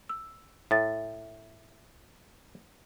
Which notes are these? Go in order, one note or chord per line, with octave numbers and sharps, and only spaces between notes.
E6
A2 E5 A6